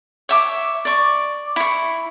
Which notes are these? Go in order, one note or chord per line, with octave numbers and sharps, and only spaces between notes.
C#5 E5 D6
D5 C#6
E4 C#6